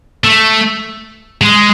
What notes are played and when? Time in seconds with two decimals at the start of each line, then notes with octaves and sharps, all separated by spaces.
0.24 A3
1.41 G#3